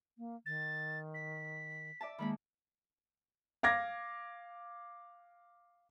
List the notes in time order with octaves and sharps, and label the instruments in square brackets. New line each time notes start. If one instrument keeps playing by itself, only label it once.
[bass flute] A#3
[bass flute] D#3 [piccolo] A6
[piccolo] B6
[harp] D5 E5 A5
[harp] D#3 G#3 A#3 [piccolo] B5
[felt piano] F5 D6 G#6 A#6